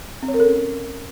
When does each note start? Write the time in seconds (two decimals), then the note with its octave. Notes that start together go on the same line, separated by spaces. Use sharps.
0.23 C4
0.28 C#5
0.34 A#4
0.40 A4
0.46 C#4